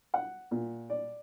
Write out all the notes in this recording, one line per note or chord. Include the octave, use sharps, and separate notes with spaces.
F#5
A#2
D5